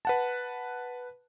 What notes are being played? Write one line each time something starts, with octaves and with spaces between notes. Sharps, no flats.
B4 F#5 A5